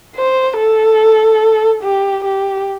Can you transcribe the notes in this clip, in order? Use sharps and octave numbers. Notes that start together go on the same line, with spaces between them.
C5
A4
G4
G4